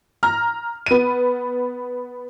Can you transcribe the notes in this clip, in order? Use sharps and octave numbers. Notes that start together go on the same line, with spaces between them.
A#5 F6
B3 D#7